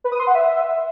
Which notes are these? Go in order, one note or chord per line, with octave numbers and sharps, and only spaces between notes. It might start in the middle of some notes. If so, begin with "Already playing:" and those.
B4
D#6
C6
F#5
E5